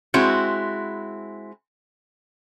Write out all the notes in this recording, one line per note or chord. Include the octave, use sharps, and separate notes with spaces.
G#3 C4 E4 F#4